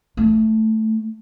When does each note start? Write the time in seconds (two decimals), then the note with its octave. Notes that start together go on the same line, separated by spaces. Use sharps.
0.17 A3